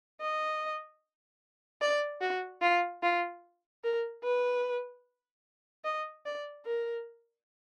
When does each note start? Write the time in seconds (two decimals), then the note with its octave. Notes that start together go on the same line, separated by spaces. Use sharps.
0.21 D#5
1.81 D5
2.21 F#4
2.62 F4
3.03 F4
3.84 A#4
4.24 B4
5.84 D#5
6.26 D5
6.66 A#4